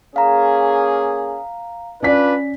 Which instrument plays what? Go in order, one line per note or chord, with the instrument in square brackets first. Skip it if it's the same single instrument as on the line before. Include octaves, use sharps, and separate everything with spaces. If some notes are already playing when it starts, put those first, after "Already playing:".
[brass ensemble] A#3 C#4 G#4 [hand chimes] F5 A#5
[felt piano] C#4 D5 B6 [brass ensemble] D4 F4 B4